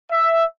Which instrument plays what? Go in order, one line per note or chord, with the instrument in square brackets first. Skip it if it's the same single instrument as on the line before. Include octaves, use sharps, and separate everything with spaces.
[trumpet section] E5